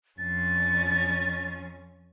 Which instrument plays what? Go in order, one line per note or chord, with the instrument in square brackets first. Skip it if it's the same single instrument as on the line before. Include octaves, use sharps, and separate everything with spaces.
[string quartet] F2 C#4 [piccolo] A6